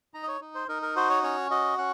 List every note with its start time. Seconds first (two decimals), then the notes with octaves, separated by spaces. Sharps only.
0.14 D#4 A#5
0.23 D#5
0.28 C#5
0.41 D#4
0.55 C5
0.68 D#4 A#4
0.82 A#4
0.96 F#4 C5
1.10 C#5
1.23 C#4 C#5
1.51 F#4 D#5
1.78 C#4 F#5